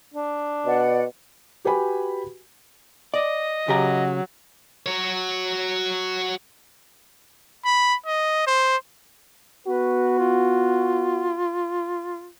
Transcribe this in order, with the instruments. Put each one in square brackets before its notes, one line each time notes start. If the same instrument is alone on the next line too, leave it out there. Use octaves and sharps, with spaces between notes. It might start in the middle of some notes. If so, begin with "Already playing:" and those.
[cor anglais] D4
[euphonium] B2 [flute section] D5 F#5
[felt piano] F#4 G4 B4 G5 G#5 B5
[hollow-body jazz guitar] D5 [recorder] D#5
[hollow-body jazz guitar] C#3 G4 A#5 [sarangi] F#3
[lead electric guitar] F#4 C#5
[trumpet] B5
D#5
C5
[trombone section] B3 F#4 [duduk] B4
[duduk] F4